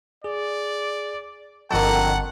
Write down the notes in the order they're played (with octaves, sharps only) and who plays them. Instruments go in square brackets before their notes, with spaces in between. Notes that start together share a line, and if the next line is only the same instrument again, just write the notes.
[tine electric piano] G#4 [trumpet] D5
[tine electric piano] G1 A5 [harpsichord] F2 D3 D#3 [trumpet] F#5